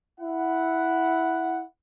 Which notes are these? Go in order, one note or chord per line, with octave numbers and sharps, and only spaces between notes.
E4 F#5